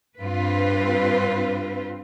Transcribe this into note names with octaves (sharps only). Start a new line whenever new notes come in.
G2 C4 F4 B4